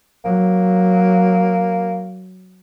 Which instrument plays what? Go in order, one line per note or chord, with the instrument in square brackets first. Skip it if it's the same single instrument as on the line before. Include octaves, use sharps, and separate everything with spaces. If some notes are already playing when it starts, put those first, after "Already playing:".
[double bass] F#3 [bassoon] A#3